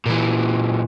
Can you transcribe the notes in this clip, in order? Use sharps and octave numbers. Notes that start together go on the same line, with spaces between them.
A#2 E3